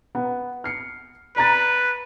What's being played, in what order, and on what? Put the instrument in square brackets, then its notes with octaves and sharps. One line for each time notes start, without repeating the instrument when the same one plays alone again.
[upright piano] B3
F6 C7 C#7
[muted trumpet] B4 [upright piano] D5 A#5 A6